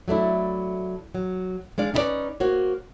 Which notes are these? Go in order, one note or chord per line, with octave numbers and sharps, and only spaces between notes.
F#3 A3 D4 E4
F#3
G#3 D4 D5 F5
C#4 D#4 E4 B4 C#5 D5
A#3 F#4 C5 C#5